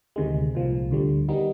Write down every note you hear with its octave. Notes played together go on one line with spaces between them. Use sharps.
D2 C3 D#3 G#3
C2 A#2 F3
D2 D3 G3
D#3 G3 B3 D#4